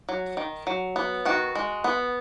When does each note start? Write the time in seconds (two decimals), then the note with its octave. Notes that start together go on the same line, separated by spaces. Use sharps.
0.09 F#3
0.37 D#3
0.67 F#3
0.96 B3
1.25 D#3 F#4
1.55 G#3
1.84 B3